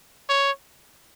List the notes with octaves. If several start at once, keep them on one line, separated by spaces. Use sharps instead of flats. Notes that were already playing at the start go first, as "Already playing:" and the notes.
C#5